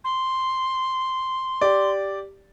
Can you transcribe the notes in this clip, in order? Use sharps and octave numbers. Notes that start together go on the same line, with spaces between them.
C6
G4 D5